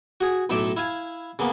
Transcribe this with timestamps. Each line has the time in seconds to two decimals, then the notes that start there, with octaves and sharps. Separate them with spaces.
0.21 F#4 G#4
0.50 B1 A2 A3 A4 E5 D6
0.77 E4 F5 G#5
1.39 C#3 A#3 B3